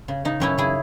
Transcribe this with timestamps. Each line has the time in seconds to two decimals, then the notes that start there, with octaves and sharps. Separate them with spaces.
0.08 C#3
0.25 C#3 D#4
0.40 F#2 C#4 E4
0.58 C#3 E4 G#4